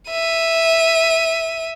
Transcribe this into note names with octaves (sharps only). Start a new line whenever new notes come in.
E5 D#7